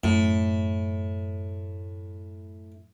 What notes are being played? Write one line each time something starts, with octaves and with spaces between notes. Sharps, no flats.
F#2 A2